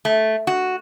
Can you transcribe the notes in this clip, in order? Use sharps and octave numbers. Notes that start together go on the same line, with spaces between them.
A3
F#4